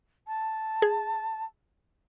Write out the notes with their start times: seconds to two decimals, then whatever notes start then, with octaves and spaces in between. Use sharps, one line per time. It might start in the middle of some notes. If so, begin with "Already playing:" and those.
0.27 A5
0.82 G#4